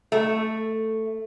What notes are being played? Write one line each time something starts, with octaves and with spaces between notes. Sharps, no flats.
A3